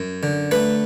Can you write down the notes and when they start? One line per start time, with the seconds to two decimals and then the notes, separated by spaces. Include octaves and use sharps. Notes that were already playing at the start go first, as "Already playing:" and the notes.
Already playing: F#2
0.23 D3
0.51 A3 B4